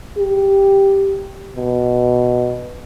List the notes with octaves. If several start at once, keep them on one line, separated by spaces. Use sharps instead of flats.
G4
B2